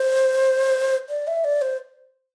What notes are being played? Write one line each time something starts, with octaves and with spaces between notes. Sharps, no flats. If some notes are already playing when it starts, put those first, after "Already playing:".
Already playing: C5
D5
E5
D5
C5